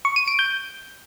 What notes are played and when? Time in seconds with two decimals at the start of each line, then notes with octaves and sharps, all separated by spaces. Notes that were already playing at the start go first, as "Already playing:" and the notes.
0.05 C#6
0.16 D#7
0.27 D7
0.39 G6